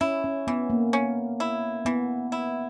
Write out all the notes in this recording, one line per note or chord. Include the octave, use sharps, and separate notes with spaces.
C#4 E4
C#4
E3 B3
A#3
C#4
E4
E3 B3
E4